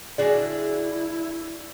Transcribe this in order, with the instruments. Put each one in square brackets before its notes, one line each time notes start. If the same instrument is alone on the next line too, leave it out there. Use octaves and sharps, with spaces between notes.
[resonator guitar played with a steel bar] D3 F#3 G3 [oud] D4 F#4 G#4 [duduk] E4 [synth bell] D5